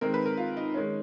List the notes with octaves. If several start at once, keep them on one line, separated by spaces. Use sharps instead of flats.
D#3 G#3 C4 A#4
B4
A#4
F4
D#4
D#3 G#3 C#4